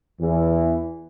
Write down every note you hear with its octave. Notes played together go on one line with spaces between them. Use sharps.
E2 E3